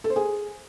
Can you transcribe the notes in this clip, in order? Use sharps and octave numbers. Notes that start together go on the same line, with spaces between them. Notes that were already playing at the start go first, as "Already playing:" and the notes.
A4
C5
G#4